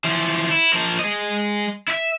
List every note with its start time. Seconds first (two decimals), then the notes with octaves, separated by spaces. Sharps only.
0.04 E3 F3
0.51 E4
0.73 F3 A#4
0.99 G#3 D#5
1.88 E4 E5